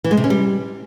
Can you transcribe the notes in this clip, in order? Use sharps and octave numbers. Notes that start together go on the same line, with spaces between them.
E3
G#3
C3
C#4
G3